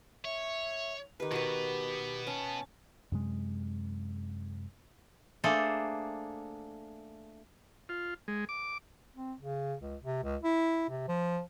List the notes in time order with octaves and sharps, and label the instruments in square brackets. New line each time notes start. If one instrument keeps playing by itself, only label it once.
[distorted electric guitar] C#5 [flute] E5
[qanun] D#3 B4 [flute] G4
[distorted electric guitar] B2 B3 [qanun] F#4 B4
[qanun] C#4 [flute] A5
[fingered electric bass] F#2 C3 G#3
[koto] A3 A#3 D4 G#4 A4 C5
[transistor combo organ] F4
G#3
D6
[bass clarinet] C4
C#3
C#2
C3
C#2
E4
C3
F3